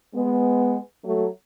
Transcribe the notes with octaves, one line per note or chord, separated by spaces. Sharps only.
G#3 B3
F#3 A3